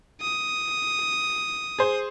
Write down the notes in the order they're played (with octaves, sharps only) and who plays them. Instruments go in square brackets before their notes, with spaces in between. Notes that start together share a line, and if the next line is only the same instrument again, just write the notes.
[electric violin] D#6
[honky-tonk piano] G#4 C5